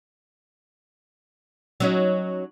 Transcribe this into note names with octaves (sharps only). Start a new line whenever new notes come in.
F#3 C#4 D#4